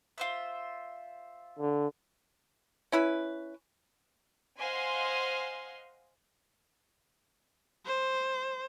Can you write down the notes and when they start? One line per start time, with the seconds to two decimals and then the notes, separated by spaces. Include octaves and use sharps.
0.18 F4 C5 E5
1.59 D3
2.92 C#4 E4 B4
4.58 C5 D#5 F5 F#5 G#5 C6
7.86 C5